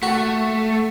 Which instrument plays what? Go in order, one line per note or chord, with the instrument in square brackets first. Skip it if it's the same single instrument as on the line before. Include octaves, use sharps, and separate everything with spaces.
[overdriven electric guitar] A3 [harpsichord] F#4